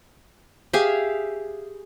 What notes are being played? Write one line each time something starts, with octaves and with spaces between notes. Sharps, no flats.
G4 G#4 E5 F5